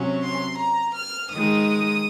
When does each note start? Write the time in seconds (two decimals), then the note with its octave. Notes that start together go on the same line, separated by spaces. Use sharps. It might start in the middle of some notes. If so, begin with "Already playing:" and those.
Already playing: C3 F#3 C#4
0.22 C6
0.59 A#5
0.95 F6
1.32 D#3 G#3 D#4 D#6